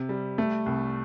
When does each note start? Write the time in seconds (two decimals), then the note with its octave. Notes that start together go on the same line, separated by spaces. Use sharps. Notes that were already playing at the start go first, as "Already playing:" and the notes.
Already playing: C3
0.09 G3
0.38 A3
0.66 C2